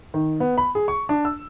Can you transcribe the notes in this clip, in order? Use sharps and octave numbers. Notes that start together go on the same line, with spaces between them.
D#3
B3
B5
G#4
C#6
D4
E6